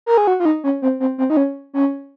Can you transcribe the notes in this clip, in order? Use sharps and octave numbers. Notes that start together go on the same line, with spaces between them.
A#4
G#4
F#4
F4
D#4
C#4
C4
C4
C4
D#4
C#4
C#4